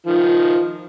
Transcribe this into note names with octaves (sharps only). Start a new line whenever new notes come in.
D#3 F3